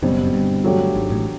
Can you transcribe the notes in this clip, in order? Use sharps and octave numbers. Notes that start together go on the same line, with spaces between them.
F#1 F#2 B2 G3 C4
F#2
G1 G2
F#3 A3 D4 G4
G#1 G#2
A1 A2